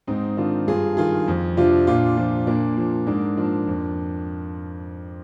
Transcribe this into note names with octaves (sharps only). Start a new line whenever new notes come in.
G#2 C4 D#4
D#3 D4 F4
G2 F4 G#4
D#3 F4 G#4
F2
C3 F3 D4 F4
A#2 D4 F4
F3
A#2 A#3 D4
F3
G#2 A#3 D4
F3 A#3 D4
F2